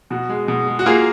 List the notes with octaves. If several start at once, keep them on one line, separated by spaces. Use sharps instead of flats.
B2 F#4
G#3
B2
G#3
F#4
A#3 F4 G#4